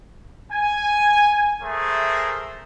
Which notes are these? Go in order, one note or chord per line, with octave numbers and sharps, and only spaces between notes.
G#5
A3 G#4 A#4 C5 E5